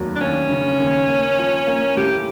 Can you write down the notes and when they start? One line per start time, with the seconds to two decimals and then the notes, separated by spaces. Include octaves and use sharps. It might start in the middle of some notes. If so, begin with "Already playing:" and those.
Already playing: F1 D#2 F#3
0.16 D4
0.21 D#2 C#4
0.50 C#3
0.79 D#2
1.09 A#3
1.38 F3
1.67 A#3
1.97 A2 G4